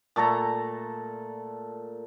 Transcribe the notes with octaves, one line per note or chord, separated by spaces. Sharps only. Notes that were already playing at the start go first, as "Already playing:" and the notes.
A#2 A3 A4 A#5